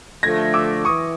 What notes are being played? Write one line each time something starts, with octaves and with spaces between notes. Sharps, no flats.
D3 F3 A3 G#6 A#6
D6 E6
E3 C#6 D#6